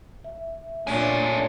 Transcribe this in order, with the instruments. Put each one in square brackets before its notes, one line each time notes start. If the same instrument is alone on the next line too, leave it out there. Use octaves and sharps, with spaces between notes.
[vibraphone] E5
[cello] A#2 D4 [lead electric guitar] A3 G#4 [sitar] C#4